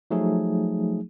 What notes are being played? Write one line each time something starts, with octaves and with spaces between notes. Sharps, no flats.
F3 F#3 A3 D#4 G#4